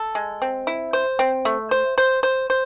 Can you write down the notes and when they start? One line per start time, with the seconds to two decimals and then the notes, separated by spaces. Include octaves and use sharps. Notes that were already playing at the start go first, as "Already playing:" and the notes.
Already playing: A4
0.15 G#3
0.42 C4
0.67 E4
0.93 C5
1.19 C4
1.45 A3
1.71 C5
1.98 C5
2.23 C5
2.50 C5